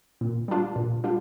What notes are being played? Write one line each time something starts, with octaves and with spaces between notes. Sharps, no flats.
A#2
G3 D4 F4
A#2
G3 D4 F4